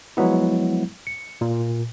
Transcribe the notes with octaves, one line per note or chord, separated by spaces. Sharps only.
F3 F#3 G#3 B3 E4
C#7
A#2